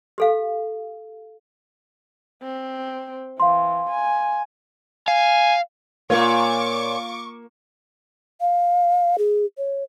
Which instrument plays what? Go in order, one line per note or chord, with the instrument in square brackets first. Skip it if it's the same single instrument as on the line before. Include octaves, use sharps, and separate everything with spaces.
[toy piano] G4 A4 F5
[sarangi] C4
[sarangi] E3 [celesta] F5 C6
[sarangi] G#5
[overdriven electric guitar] F5 [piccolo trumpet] G#5
[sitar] A#2 C#5 [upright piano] A#3 [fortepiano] F4 [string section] C#6 D6
[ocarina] F5
G#4
C#5